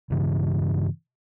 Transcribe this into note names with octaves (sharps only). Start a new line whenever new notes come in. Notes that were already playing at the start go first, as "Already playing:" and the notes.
G2 C#3 E3